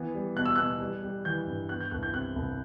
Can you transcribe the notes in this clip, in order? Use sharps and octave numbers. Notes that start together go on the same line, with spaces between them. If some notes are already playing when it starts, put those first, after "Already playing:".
Already playing: E3 B3
G3
B2 F#6
E6
B2 F#6
G3
G3
E3 G6
G2
B3 F#6
G6
C2 F#6
G6
C3 F#6
C2